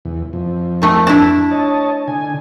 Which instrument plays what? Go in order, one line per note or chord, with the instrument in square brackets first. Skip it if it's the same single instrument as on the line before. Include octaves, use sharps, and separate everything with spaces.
[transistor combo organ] E2
F2
[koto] D#3 A3
D4 E4
[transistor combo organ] C#5 D#5 A5
D3 G#5